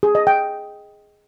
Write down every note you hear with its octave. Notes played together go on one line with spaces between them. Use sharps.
G#4
D#5
G5